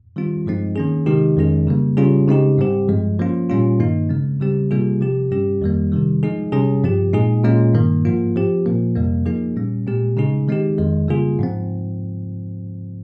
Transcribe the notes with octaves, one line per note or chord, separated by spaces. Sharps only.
D#3 G3 C4 F4
G2 F3 G#3 C4 D#4
D#3 A#3 C#4 G#4
C3 D#3 G#3 D#4 G4
F2 D#3 G#3 C#4 G#4
C#3 G3 A#3
C#3 G3 C#4 F4 G#4
C#3 G#3 C4 D#4 G4
G#2 G3 C4 G4
G2 F3 G#3
F3 A#3 C#4 F4
A#2 G3 C#4 F4
G2 D#3 A#3 D#4
C#3 G#3 C4
C#3 G3 C4 G4
C3 G3 A#3 F4 G#4
C3 F3 C4 G4
G2 G3 C#4 G4
F2 D#3 G3 A#3
C3 D#3 G3
F3 G#3 D#4 G#4
C3 G3 C#4 G#4
G2 F3 C4 G4
A#2 G#3 D#4 G#4
A#2 G#3 C#4 F4
G2 D#3 A#3
G#2 F3 A#3 F4
F3 C4 G4
A#2 F3 A#3
F2 C3 G3 A#3
F3 A#3 D#4 G#4
A#2 G3 C#4
A#2 G#3 C4 G4
C#3 G#3 D#4 G#4
D#3 G#3 C4 D#4 G4
F2 D#3 G#3
C#3 G3 A#3 F4 G#4
G#2 F3 C4